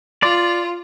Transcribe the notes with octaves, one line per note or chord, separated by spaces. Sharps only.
F4 D5 C6